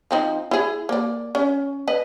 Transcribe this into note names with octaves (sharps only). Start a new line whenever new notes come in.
F3 C4 D#4
E4 G#4
A#3 D5
C#4
B4 D#5